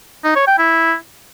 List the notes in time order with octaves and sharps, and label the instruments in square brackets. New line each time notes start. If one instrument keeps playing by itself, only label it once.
[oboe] D#4
C#5
G5
E4